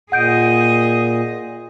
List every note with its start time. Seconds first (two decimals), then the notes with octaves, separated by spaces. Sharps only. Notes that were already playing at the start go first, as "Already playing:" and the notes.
0.12 A#2 G#4 D#5 F#5 G6 D7